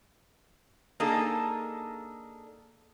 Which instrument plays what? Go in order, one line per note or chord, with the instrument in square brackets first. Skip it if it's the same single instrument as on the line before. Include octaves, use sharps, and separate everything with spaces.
[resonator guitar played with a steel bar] A#3 D4 D#4 G#4 A4